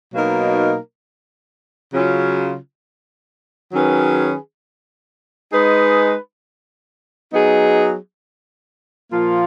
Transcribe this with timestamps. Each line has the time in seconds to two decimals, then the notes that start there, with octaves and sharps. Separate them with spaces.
0.13 B2 F#3 A#3 D#4 A#4
1.93 C#3 F#3 C#4 F4
3.72 D#3 F#3 C#4 G#4 B4
5.52 G#3 D#4 G#4 B4
7.32 F#3 B3 D#4 G#4
9.11 A#2 F3 A#3 F4